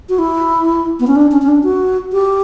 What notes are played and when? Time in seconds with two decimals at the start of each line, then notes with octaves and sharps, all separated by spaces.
0.09 F#4
0.19 E4
1.00 B3
1.07 C#4
1.16 D4
1.31 C#4
1.42 C#4
1.48 D4
1.64 F#4
2.12 G4